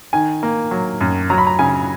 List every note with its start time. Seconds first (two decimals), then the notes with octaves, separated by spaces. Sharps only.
0.13 D#3 G#5
0.43 A#3
0.71 F#3
1.01 F#2
1.30 F#3 A#5
1.38 B5
1.47 A#5
1.59 C#3 G#5